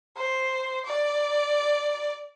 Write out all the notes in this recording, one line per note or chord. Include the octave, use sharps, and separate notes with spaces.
C5
D5